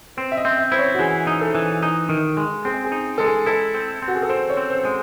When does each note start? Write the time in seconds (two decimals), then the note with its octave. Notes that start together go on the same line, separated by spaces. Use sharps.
0.17 C4 C5
0.32 E5
0.37 D#5
0.45 C4
0.58 E5
0.72 E4 C5
0.79 C#5
0.94 F#4
0.99 E3 G#4
1.27 D#4
1.41 A4
1.55 E3
1.83 D#4
2.09 D#3
2.37 G#3
2.65 C4 G#4
2.84 G#4
2.92 D#4
3.18 G#3 A4
3.26 G#4
3.46 E4 A4
3.74 C4
4.02 C4
4.08 F#4
4.15 G#4
4.23 A4
4.29 C4 C5
4.50 C#5
4.57 C4
4.70 C5
4.85 G#3